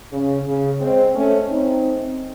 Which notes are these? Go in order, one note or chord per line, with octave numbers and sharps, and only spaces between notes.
C#3
C#3
G#3 C4
A3 C#4
C4 D#4